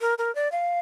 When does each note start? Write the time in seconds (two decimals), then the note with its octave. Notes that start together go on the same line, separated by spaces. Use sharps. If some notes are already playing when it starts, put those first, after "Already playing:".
0.01 A#4
0.18 A#4
0.35 D5
0.52 F5